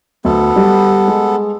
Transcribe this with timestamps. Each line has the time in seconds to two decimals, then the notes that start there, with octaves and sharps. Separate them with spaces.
0.25 D2 B3 A4
0.56 G3
1.08 G#3